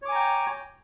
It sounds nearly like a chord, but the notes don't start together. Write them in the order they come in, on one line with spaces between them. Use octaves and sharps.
C#5 D6 G#5 A#5 G5